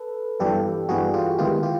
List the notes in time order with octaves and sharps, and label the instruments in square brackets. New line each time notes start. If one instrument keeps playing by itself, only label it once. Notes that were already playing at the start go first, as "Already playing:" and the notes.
Already playing: [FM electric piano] A4 B4
[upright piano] G2 E3 G3 B3 [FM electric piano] G4 A4
[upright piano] G2 E3 G3 B3 [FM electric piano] F#4 G#4
[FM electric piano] F4 G4
[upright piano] D#3 G#3 B3 E4 [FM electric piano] F4 G4
[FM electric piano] F4 G4